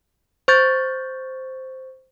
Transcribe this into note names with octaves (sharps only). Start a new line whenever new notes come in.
C5 C#6 G6 A6